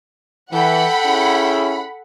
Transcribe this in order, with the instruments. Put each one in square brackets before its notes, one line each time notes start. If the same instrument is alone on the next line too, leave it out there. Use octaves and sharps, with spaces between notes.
[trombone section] E3 [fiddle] A4 G5 [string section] F#5 B5
[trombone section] C#4 E4 G#4